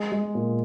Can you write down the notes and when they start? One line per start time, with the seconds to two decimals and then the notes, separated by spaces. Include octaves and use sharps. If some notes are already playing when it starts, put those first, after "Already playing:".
Already playing: G#3
0.12 G#3
0.35 A#2